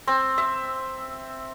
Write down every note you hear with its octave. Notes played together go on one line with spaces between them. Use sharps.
C4
E5